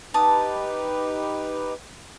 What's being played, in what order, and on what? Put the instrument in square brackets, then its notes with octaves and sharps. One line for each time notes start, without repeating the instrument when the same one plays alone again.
[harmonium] D#4 G4 B4 [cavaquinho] A5 D#6